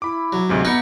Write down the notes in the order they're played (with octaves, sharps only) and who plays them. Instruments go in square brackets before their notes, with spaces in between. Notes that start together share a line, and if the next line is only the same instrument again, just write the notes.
[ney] E4 [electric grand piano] B5 D6
[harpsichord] F#3
[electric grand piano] D2 G#2 C3 [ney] D#5
[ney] B3 [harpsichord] D#4 E4 B4 [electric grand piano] A#6 C#7